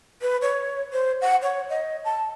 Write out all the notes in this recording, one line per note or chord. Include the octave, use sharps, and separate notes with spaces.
B4
C#5
C5
F#5
C#5
D#5
A5